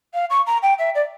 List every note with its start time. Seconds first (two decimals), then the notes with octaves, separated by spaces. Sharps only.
0.14 F5
0.30 C#6
0.46 A#5
0.62 G5
0.78 E5
0.94 D5